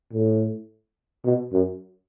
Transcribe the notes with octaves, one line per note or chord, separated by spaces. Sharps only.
A2
B2
F#2